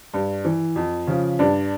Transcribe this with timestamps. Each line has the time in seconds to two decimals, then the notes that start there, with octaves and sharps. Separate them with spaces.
0.14 G2
0.45 E3
0.76 F2
1.07 C#3 F3
1.39 G2 D4